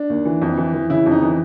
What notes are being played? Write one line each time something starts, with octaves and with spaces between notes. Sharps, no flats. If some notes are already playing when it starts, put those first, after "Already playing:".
Already playing: D4
D#2
E3
F2
E3
E3
C#3 E4
F2
D#4
E3